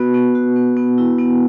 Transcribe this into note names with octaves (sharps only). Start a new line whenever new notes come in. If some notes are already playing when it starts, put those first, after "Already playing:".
Already playing: B3 F#4 B4
B3
F#4
B3
B3
E4
B3